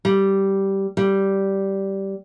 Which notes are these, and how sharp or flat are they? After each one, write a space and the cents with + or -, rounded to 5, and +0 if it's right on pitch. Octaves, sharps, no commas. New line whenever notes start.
G3 -10
G3 -10